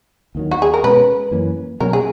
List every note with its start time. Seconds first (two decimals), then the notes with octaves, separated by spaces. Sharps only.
0.35 D#2 D#3 F#3
0.51 F#4
0.62 G#4
0.74 A#4
0.83 B2 G#3 C#4 B4
1.31 F#2 E3 A#3 C#4
1.80 B2 F#3 A#3 C#4 A#4
1.93 G#4